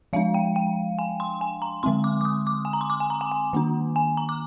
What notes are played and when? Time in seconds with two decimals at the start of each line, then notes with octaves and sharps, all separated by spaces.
0.13 F3 G#3 D4 F5
0.34 G5
0.56 G5
0.99 G#5
1.20 C6
1.41 G#5
1.62 A#5
1.83 D3 G#3 C4 C6
2.04 D6
2.21 D6
2.25 D#6
2.47 D6
2.65 G#5
2.73 A#5
2.81 C6
2.90 D6
3.00 G#5
3.10 A#5
3.21 G#5
3.32 G#5
3.53 D#3 A#3 D4
3.96 G#5
4.17 A#5
4.29 D6